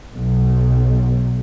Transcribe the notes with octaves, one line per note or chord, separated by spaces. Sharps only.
B1